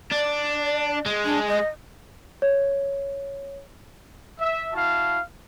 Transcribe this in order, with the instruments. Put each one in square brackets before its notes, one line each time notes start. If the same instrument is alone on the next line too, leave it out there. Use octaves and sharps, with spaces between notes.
[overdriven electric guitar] D4 [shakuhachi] D5
[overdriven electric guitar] G#3
[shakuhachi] D4
D#5
[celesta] C#5
[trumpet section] E5
E4 F#4 F5 A5